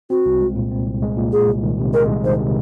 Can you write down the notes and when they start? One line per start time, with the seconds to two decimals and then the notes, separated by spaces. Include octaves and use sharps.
0.10 C4 F#4
0.26 C2
0.41 G#3
0.56 A#2
0.71 C4
0.87 C2
1.02 G#3
1.17 A#2
1.32 G#3 G#4
1.48 C2
1.63 D#3
1.79 C3
1.94 G#3 A#4
2.09 C2
2.24 D#3 C5
2.40 C3